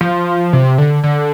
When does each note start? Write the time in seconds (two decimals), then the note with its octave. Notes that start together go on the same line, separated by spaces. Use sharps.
0.01 F3
0.53 C3
0.78 D3
1.04 D3